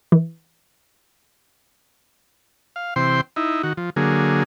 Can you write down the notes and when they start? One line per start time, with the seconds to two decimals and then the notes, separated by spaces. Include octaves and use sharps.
0.12 E3
2.76 F5
2.96 C3 E3 C5 G5 C6
3.36 D#4 E4
3.63 D#3 F#4
3.77 F3
3.96 D3 F#3 A#3 G#4